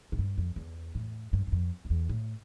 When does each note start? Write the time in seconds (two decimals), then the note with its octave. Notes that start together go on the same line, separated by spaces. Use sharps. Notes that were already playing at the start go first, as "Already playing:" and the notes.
0.12 A2
0.19 G2
0.38 F2
0.56 E2
0.95 A2
1.33 G2
1.47 G2
1.52 F2
1.85 F2
1.90 E2
2.09 A2